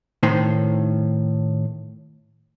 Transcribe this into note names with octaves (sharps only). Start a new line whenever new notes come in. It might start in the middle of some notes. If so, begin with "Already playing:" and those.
A2 D#3 C5